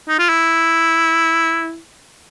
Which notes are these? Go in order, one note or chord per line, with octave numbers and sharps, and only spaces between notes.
D#4
F4
E4